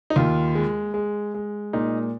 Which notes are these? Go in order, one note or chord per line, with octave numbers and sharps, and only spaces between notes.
D#4
D#2 F4
G#3
G#3
G#3
A#2 D#4